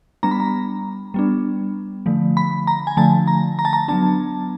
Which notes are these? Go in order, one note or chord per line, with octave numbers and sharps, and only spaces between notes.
G3 B3 D4 A#5
B5
A#5
G3 B3 D4
D3 F3 A3
B5
A#5
G#5
D3 F3 A3 A5
A#5
A#5
A5
A#5
F#3 B3 D4 A5